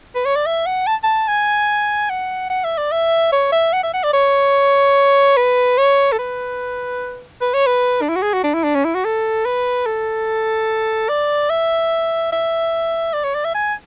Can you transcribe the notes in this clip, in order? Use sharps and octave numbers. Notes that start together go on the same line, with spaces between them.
B4
C#5
D5
E5
F#5
A5
A5
G#5
F#5
F#5
E5
D5
E5
C#5
E5
F#5
E5
F#5
D5
C#5
B4
C#5
A4
B4
B4
C#5
B4
D4
E4
F#4
G#4
F#4
D4
E4
D4
C#4
E4
F#4
A4
B4
A4
D5
E5
E5
D5
C#5
D5
E5
G#5